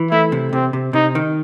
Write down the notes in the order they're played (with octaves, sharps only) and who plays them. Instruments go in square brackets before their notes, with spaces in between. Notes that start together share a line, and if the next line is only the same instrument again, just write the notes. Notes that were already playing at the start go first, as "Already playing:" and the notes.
Already playing: [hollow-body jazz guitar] E3
[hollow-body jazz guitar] A3 [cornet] E4
[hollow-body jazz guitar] C3
[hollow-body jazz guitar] C3 [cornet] C4
[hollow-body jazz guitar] C3
[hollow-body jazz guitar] C3 [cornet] D#4
[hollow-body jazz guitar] D#3